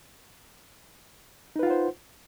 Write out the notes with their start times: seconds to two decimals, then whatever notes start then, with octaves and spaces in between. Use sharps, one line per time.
1.56 D#4
1.59 B4
1.63 F4
1.67 F#5
1.70 C5